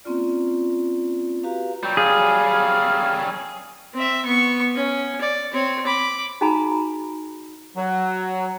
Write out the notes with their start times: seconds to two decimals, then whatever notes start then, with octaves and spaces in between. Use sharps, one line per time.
0.04 A#3 C4 C#4 F4 D5
1.43 F#4 G4 B4 F5 A#5
1.83 F#3 G3 G5
1.97 G#4 F5
3.94 C4 E5
4.25 B3 C#6
4.76 C#4
5.21 D5
5.53 C4 C#5
5.86 B5 D6
6.41 D#4 F#4 G#4 G#5 A#5 B5
7.77 F#3